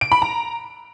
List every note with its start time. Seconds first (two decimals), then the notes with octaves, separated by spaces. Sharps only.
0.01 D7
0.12 B5
0.22 A#5